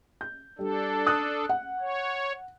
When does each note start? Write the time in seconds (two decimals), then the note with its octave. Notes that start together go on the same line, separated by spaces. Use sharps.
0.21 G6
0.59 G3 D4 A4
1.06 D#6 F#6
1.49 F#5
1.80 C#5